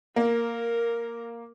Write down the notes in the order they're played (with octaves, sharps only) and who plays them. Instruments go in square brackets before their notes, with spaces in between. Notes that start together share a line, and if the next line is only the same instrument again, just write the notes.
[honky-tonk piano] A#3 [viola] A#4